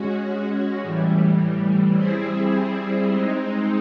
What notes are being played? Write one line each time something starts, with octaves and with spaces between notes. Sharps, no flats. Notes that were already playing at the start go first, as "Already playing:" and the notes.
Already playing: G#3 C#4 F#4
A2 E3 G3
G3 C4 E4 G#4
G#3 C4 D#4